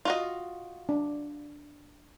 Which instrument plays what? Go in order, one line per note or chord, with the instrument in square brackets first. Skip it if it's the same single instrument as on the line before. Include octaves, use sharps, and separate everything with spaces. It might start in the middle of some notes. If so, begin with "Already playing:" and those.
[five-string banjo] F4 F#4 D#5
[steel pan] D4